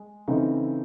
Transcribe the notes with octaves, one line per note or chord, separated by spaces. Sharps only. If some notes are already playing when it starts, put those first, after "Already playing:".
Already playing: G#3
C#3 E3 A3 C4 D#4